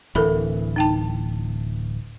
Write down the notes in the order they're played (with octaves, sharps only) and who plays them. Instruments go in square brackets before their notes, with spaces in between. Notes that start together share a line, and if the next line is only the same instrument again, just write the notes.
[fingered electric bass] D1 E3 [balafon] A4 A#4 B5
[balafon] D#4 G5 A5